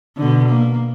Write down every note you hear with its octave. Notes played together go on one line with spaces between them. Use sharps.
B2 D3
A#3